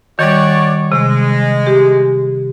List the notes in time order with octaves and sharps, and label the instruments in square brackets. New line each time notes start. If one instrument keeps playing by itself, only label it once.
[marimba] D#3 G3 [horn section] F#4 C#5 D5
[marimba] C3 [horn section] G#3
[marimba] G4